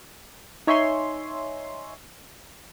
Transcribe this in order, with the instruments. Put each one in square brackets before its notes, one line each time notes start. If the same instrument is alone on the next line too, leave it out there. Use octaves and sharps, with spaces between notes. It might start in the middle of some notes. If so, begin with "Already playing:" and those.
[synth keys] D#4 C#5 E5 G#5 C6